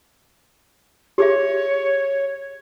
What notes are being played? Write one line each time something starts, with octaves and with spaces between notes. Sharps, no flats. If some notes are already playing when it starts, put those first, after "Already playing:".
G4 G#4 C#5 E5